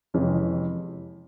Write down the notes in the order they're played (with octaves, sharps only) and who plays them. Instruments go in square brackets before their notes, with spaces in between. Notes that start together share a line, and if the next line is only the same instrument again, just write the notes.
[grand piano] F2 C3 E3 G#3 C#4